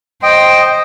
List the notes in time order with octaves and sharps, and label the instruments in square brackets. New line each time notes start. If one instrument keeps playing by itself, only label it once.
[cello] C5 [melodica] D#5 G5